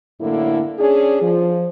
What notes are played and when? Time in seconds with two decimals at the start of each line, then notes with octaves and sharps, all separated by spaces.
0.20 F#2 A2 D3 A#3 E4
0.78 C#4 D4 G#4
1.21 F3